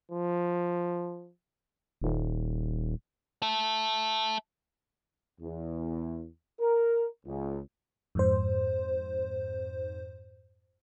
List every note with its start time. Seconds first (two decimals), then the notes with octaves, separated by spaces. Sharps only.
0.11 F3
2.02 D#1
3.42 E5 A5
5.40 E2
6.59 A#4
7.25 C#2
8.15 F2 G#2 C5